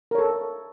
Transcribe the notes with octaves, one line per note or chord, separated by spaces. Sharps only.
A4 A#4 C#5